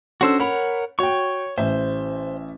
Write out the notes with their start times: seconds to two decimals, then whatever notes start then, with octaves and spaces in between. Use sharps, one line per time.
0.21 C#4 D4 F#4 A4 C5 E6
0.40 A#4 C#5 F#5 B5
0.99 F#4 C#5 G5 C#6
1.58 A1 C5 E5